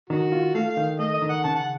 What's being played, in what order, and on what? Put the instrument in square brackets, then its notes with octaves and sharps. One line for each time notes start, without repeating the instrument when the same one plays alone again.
[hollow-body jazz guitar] D#3 [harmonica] F#4
[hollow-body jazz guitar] F4
[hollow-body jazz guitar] A3 [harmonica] F5
[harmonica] F5
[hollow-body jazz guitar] D#3
[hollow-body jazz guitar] A3 [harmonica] D#5
[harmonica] D#5
[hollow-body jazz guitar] D#3
[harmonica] F#5
[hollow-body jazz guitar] C#3 [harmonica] A5
[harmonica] F#5